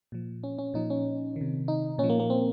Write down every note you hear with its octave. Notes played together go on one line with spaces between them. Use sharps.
A#2 F3
C#4
C#4
A#2 F3 D#4
C#4
C3 D#3
D#4
A#2 C#4
F3
A#3
A#3
C4